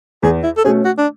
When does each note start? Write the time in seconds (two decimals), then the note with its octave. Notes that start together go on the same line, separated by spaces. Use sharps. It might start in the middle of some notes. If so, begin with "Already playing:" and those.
0.23 E2 G#4
0.43 E4
0.57 A4
0.64 B2 A3 C#4 G#4
0.85 F#4
0.98 D4